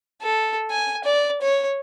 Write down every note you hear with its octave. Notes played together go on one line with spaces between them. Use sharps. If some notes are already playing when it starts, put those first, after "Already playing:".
A4
G#5
D5
C#5